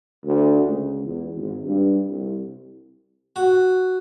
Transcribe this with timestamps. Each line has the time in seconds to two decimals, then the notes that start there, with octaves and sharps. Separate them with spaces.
0.23 D2
0.63 C#2
1.04 E2
1.34 G#1
1.64 G2
2.08 C2
3.36 F#4